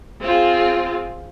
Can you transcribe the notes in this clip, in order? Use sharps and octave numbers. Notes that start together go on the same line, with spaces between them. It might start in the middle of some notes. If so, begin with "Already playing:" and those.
C4 F4 G#4